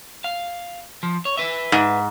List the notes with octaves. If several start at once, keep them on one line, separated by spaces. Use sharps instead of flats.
F5
F3
C#5
B4 E5
G#2